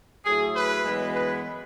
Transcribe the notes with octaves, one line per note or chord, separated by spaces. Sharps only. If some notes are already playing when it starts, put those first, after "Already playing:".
A2 F#3 A3 G#4
B4
F#2 E3 G#3 B3
B4